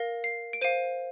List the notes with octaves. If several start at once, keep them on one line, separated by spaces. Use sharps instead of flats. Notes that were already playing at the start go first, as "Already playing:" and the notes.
Already playing: A#4 F5 A#6
C7
D7
C5 F5 D#7